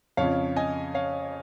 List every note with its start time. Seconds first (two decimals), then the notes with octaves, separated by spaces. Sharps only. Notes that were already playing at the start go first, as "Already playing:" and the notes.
0.17 F2 C#3 F3 C#5 F5
0.56 D#5 G#5
0.95 C#5 F5